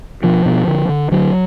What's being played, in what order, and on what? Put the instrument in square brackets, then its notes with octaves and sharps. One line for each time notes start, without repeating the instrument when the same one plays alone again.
[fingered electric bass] B2 F3
B2
D3
D3
D3 F#3